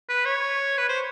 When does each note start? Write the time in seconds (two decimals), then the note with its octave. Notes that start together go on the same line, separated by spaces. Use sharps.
0.09 B4
0.25 C#5
0.78 B4
0.89 C5